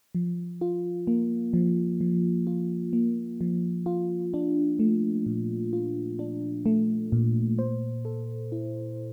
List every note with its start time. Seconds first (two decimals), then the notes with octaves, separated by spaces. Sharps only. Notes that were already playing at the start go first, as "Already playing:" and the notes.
0.15 F3
0.61 F4
1.07 A#3
1.53 F3
2.01 F3
2.47 F4
2.93 A#3
3.41 F3
3.86 F4
4.34 D4
4.79 A3
5.26 A#2
5.73 F4
6.19 D4
6.66 A3
7.12 A#2
7.59 C5
8.05 A4
8.52 E4